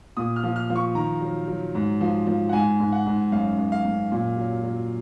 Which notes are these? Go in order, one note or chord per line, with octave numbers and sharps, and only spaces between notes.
A#2 D#6
F6
F3
F6
F3
C#6
D#3 A#5
F#3
F#3
G#2
F3
F3
F#5
G#2 G#5
G#2
F#5
G#2
F#2 F5
F#2
F5
F#2
A#2
F#3
F#3